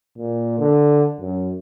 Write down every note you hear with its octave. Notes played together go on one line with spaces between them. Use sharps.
A#2
D3
F#2